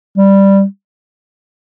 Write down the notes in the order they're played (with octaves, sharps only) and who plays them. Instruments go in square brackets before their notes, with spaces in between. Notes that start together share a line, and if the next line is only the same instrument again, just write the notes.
[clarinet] G3